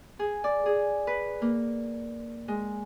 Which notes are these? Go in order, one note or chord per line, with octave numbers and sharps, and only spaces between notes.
G#4
D5
G#4
B4
A#3
G#3